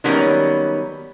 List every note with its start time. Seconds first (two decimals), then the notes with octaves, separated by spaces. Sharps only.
0.04 D#3 F#3 G3 A#3 B3 C#4